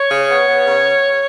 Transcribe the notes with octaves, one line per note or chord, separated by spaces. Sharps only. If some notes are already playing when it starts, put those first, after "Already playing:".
Already playing: C#5
C#3
B3
B3
C#3